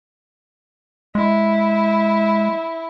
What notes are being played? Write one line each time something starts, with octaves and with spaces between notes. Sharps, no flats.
G#3 E4